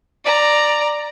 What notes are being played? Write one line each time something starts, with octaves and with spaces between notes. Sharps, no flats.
D5 A#5